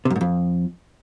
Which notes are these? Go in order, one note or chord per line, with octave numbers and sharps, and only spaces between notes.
C3
F#2
G#2
F2